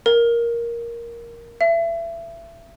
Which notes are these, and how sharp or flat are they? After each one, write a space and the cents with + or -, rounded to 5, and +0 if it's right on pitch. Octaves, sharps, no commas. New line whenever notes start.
A#4 +5
E5 +30